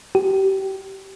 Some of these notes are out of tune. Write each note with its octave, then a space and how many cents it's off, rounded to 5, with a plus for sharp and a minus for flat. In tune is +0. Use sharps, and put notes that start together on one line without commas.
G4 -30